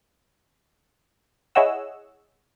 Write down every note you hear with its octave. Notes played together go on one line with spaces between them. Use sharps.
E4 G#4 C#5 D#5 F#5 E6